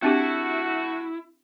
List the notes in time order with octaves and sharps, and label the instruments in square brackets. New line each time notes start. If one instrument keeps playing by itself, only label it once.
[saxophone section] A3 F#4 [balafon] C4 D4 G4 [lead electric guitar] E4